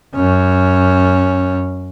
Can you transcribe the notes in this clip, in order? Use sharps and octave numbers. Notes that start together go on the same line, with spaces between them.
F#2 C#4